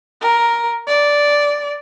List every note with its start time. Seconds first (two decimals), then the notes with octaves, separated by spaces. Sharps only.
0.21 A#4
0.88 D5